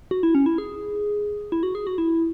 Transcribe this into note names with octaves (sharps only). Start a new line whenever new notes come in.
F#4
E4
C#4
E4
G#4
E4
F#4
G#4
F#4
E4